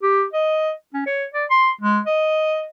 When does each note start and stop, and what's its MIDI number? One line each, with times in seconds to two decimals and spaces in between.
0.03 0.25 67
0.33 0.70 75
0.94 1.02 61
1.06 1.25 73
1.34 1.45 74
1.50 1.71 84
1.81 2.00 56
2.06 2.66 75